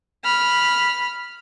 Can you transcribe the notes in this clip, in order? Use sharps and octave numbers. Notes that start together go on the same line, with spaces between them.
B5 F6